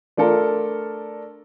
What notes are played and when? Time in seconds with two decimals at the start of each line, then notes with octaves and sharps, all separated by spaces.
0.17 A3 D4 F4 A4 A#4